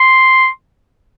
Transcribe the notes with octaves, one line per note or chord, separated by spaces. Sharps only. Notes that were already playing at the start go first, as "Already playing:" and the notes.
Already playing: C6